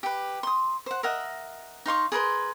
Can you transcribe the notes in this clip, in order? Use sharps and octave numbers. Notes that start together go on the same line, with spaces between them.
G4 B4
C6 D#6
C5 F#5
A#4 D#5 E5 F#5
D#4 F5 C6 C#6
G#4 A#4 B4 C6